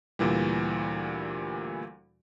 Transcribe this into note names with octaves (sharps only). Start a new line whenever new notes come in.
D2 A#2 E3 G3